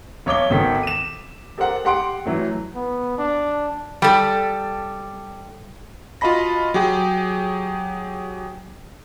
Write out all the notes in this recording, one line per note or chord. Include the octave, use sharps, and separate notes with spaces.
B1 C#5 D6 G7
G#1 B2 D#3 A4 B6
D#7 E7
G4 A4 A#4 C5 F#5
G4 F#5 C6 D7
E3 F#3 A3
B3
D4
G3 A4
F4 F#4 D#5 A5 B5 A#6
F#3 G4 G#4 G5